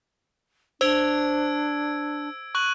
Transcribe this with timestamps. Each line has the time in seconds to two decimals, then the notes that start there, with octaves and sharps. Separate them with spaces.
0.81 D4 C5 E6 G#6 D7
2.55 C#6 F#6 F#7